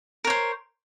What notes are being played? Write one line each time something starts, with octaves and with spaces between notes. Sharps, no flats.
A#4 C5 C#5